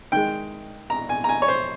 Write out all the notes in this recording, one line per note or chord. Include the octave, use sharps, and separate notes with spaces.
D#3 G#3 G5
A#5
G#5
A#5
G#5
C#5
C5